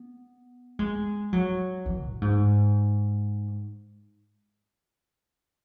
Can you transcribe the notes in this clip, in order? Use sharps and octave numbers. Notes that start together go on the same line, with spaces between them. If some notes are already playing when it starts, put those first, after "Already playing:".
Already playing: B3
G#3
F#3
E3
A2
G#2